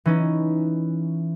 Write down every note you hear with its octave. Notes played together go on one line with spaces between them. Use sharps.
E3 C#4 D#4